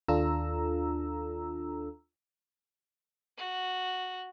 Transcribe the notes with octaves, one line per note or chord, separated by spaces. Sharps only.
D#2 D4 F4 A4 A#5 E6
F#4